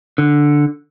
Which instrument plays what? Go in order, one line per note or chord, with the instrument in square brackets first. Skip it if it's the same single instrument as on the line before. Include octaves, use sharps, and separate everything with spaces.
[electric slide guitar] D3